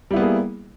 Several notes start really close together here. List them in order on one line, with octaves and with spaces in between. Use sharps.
G3 E4 B3 A#3 G#4